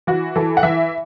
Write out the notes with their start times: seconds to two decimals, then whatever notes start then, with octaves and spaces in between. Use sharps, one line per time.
0.07 E3 F#4
0.36 E3 A4
0.57 F#5
0.63 E3 E5